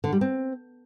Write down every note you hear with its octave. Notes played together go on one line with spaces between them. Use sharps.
D3
G3
C4